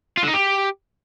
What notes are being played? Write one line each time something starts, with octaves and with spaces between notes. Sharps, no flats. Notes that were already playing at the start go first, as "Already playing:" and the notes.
F4
D3
D#4
G4